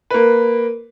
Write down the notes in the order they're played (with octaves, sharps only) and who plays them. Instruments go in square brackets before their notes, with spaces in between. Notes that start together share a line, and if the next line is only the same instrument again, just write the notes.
[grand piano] A#3 B4